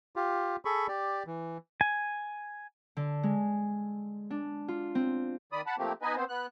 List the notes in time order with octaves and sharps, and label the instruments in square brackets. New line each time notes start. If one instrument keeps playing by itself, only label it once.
[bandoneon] F4 G4
G#4 A4 B5 C#6
G4 D5
E3
[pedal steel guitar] G#5
[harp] D3
G#3
D4
F4
C4
[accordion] D#3 D5 B5 D#6
F#5 A5 B5
F3 A3 A#3 C4 G4
B3 D#4 B4 D#5 G#5
B3 C4 C5
B3 F#6